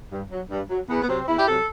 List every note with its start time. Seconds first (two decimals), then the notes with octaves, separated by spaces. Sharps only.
0.12 G2
0.31 F#3
0.50 G2
0.70 F#3
0.89 E2 B3
1.02 B3
1.08 C3 F#3 C4
1.27 E2 E4
1.39 G4
1.47 C3 F#3 A4